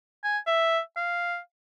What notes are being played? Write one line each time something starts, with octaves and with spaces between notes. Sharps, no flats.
G#5
E5
F5